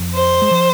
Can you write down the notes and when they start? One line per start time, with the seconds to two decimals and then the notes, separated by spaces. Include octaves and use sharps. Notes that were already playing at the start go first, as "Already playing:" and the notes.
Already playing: F2 F3
0.14 C5
0.42 G#3
0.51 F3